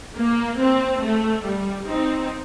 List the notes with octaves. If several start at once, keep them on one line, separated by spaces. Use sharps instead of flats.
A#3
C4
A3
G3
C4 D#4